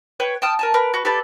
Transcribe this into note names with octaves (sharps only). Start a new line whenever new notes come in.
B4 C#5 G5
G5 A5 D#6 F6
A#4 G#5 A5
A#4 B4
F#4 B4
G4 A4 B4 D5